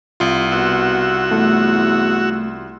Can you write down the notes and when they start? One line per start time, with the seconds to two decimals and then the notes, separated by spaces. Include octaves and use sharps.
0.20 C2 F4
0.52 B2 F#4 E6
1.31 E2 A3